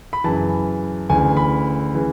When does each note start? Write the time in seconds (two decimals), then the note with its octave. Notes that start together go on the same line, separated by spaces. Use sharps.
0.13 B5
0.24 F#2 C#3 E3 A5
1.09 D2 C#3 E3 G#5
1.37 B5
1.94 C#3 E3